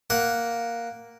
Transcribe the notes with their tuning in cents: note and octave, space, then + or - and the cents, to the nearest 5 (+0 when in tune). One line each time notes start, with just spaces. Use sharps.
A#3 +0 F#5 +0